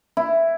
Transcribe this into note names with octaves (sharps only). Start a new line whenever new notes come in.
E4